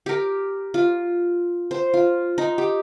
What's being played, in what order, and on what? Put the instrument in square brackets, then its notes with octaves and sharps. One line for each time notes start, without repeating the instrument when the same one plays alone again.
[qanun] G4 A#4
F4
C5
F4
D#4
G4